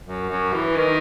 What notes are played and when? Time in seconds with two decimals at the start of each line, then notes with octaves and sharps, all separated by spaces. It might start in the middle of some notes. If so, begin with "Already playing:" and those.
0.06 F#2
0.29 F#2
0.53 E3
0.76 D#3